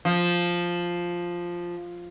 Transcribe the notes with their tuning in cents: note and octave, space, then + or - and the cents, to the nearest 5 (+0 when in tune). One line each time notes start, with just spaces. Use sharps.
F3 +0